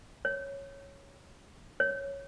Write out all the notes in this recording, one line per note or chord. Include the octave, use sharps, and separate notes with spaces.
C#5
C#5